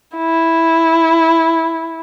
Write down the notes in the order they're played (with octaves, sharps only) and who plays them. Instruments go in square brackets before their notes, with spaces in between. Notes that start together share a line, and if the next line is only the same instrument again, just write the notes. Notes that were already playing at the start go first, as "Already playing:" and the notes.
[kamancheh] E4